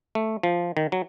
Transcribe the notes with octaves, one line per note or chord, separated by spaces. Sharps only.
A3
F3
D#3
F#3